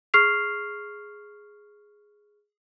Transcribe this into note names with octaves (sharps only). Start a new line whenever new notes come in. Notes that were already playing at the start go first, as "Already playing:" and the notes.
G#4 C#6 F6 C7 F7